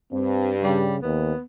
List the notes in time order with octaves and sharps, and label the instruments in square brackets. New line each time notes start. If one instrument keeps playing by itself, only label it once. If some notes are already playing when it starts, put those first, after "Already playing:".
[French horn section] G2 [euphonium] C4
[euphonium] C#3 [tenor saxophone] G3
[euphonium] D#2 [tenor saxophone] B3